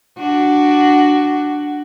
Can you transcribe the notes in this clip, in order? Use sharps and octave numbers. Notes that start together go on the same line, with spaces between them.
D4 F#4